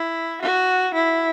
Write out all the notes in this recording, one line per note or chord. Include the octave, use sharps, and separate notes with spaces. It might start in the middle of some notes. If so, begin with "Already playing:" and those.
Already playing: E4
F#4
E4